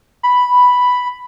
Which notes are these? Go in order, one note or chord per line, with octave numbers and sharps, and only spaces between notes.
B5